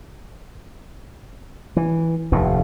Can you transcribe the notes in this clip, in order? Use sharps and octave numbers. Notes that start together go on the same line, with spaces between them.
E3
F1 D#2 A2